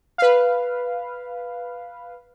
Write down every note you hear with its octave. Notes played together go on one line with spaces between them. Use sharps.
B4 F5